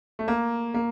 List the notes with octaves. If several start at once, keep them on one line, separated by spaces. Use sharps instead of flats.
A3
A#3
A#3